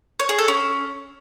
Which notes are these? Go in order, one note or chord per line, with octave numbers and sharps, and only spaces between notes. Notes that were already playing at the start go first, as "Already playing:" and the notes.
C#5
G#4
A4
C#4